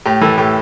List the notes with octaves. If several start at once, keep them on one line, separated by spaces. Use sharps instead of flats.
A2 G4
E3 A4
A2 G4